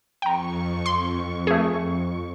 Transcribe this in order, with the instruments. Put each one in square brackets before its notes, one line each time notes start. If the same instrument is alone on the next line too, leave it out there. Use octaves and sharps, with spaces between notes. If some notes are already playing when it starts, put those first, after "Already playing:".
[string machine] F2 C#6 [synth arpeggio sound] G5 A#5
[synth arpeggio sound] C6
A3 G#4